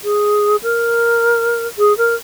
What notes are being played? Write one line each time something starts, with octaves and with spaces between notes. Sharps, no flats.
G#4
A#4
G#4
A#4